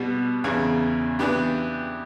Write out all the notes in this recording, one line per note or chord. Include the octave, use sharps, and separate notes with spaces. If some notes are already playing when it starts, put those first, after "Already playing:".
Already playing: B2 G3 B3 F#4
E2 C#3 E3
E3 B3 D4 G4